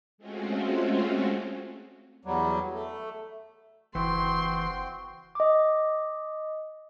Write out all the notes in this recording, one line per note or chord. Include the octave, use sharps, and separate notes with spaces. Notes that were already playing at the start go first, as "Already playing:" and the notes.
G#3 A3 C4 C#4 F4 F#4
E2 F#3 G3
A3
F#1 E3 C4 F#4 G5 C6
D#5 D6